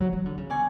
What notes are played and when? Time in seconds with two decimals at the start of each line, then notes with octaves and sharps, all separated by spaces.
0.00 F#3
0.13 E3
0.26 D3
0.37 C#3
0.50 B2 D5 G#5 C#6